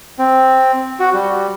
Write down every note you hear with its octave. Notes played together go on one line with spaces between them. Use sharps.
C4
F#4
G3